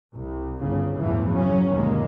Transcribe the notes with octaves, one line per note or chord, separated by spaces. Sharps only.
C2
G1 C#3
G1 E2 A2 E3 F3
C#3 F#3 C#4
G1 D#2 B2 D#3 G#3 A#3